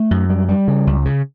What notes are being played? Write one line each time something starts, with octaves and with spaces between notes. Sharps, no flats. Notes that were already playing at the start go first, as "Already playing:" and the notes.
Already playing: A3
F#2
G3
G3
C#3
C#2
C#3